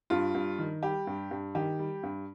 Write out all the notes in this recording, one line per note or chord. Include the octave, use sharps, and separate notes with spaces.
G2 F4
G2
D#3
G3 G4
G2
G2
D#3 G4
G3
G2